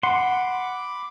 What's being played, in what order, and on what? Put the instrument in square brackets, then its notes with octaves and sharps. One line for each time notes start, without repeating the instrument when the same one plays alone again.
[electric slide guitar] F#5 [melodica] B5 D6 [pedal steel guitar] C6